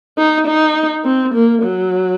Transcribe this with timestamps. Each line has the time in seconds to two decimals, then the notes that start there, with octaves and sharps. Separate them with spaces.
0.18 D#4
0.47 D#4
1.05 C4
1.34 A#3
1.62 F#3